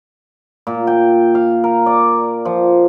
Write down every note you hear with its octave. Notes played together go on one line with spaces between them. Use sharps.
A#2
G5
F5
A#4
D5
F3